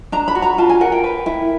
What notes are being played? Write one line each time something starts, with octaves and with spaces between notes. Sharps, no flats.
D4 A#5
B5
F#4
A#5
F4 A5
G#5
A#4 F#5
G5
B4
E4